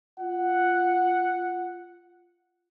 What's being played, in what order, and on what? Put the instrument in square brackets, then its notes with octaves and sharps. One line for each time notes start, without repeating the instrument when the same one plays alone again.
[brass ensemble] F4 F#5